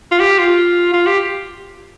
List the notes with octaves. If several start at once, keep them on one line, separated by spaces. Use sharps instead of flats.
F4
G4
F4
F4
G4